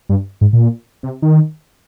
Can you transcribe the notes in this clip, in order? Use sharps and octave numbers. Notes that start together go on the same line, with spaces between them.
G2
G#2
A#2
C3
D#3